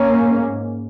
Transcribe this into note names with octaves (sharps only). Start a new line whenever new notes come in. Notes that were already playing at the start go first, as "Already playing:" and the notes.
Already playing: A#3 C#4
G#2